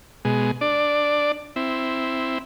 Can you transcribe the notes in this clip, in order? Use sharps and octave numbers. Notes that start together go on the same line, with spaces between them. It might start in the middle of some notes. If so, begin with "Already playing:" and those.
B2 G#3
D4 D5
C4 E4